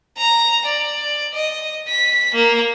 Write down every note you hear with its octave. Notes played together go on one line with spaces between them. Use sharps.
A#5
D5
D#5
B6
A#3